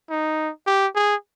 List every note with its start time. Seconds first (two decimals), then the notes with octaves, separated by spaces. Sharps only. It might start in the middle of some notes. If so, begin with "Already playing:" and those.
0.10 D#4
0.67 G4
0.95 G#4